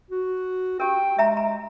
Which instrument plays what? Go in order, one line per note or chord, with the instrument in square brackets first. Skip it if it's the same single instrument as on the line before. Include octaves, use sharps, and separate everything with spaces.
[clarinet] F#4
[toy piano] G4 A#4 [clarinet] G5
[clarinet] G#3 [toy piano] E5 A#5
[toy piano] A#5